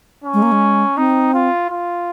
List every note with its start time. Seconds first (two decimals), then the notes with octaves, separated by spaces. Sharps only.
0.24 C#4
0.34 G#3
0.42 A#3
0.52 G#3
0.97 C4 D#4
1.34 F4
1.70 F4